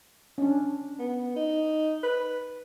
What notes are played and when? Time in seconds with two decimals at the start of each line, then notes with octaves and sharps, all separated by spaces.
0.38 C#4 D4
0.99 B3
1.36 D#4
2.03 B4